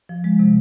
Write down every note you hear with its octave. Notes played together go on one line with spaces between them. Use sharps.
F3
G#3
C3